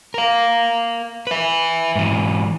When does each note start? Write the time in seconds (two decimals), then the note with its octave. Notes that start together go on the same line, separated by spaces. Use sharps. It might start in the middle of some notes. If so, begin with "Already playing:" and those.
0.14 A#4 F5
1.27 B4 E5
1.95 G#2 E3